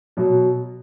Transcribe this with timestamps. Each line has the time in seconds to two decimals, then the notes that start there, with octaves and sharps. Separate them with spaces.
0.17 B2 F#3